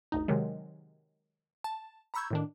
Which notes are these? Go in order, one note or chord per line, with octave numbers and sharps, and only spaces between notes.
G1 D2 D#4
C3 D#3 F#3 G#3
A5
A#5 B5 C#6 E6 G6 G#6
A2 D#3 D4